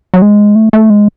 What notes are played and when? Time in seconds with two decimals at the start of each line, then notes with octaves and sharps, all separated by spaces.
0.14 F#3
0.22 G#3
0.55 A3
0.73 A3
0.90 G#3